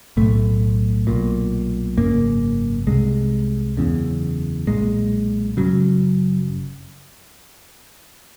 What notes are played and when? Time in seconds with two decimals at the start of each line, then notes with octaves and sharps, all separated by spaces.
0.17 B1 A2 A3
1.07 B1 A#2
1.97 G#1 F#2 C#3 A#3
2.87 C2 C3 G#3
3.77 F#1 E2 C#3
4.67 B1 A#2 G#3
5.57 F#1 F#2 C#3 F#3